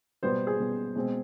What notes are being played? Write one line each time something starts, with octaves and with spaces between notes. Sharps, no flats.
B2 G3 B3 C5
G#4
B2 G3 B3
B2 G#3 C4